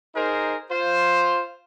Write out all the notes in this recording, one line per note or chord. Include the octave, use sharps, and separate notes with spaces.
D#4 G#4 A#4 C5
F4 C5